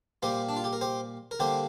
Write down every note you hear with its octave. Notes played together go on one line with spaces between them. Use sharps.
A#2 G3 A#3 G4 C5
D4
F4
G4
A#4
G4 C5
A#4
D3 G3 A#3 G4 C5